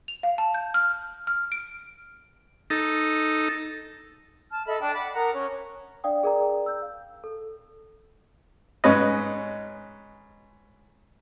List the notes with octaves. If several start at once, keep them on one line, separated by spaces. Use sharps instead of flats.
F7
F5
A5
G6
F6
F6
D7
D#4 A4
A5 F6
A4 D#5 E5 B5
D4 G5 A5
F#5 B5 D6
A#4 F#5 A#5 D#6
C#4
D4 D5 F5 G5 D#6
G#4 A#4 D5 G5 A#5
E6 G6
F5
A4
G#2 C#4 B4 D#5